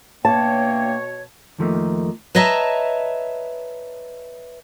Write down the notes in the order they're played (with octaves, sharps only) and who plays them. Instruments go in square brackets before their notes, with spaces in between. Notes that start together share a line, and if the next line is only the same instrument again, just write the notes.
[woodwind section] B2 C#5 [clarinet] A#3 [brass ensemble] D4 E5 G5 [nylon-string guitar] A5
[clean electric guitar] F2 D#3 F3 A3 A#3 D#4
[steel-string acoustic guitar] B4 C#5 D#5 E5 A5 A#5